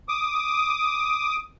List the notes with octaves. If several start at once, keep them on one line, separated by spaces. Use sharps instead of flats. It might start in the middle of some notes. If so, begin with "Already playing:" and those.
D6 D#6